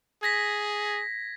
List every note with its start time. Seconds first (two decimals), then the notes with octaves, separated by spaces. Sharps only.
0.23 G#4 G#6 A#6 B6